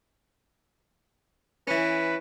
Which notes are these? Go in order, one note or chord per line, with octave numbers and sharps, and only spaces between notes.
E3 C#4 B4